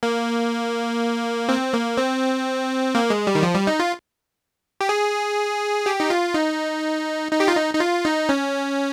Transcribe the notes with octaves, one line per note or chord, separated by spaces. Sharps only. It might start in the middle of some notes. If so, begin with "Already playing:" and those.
A#3
C4
A#3
C4
A#3
G#3
G3
D#3
F3
G3
D#4
F4
G4
G#4
G4
D#4
F4
D#4
D#4
G4
F4
D#4
D#4
F4
D#4
C#4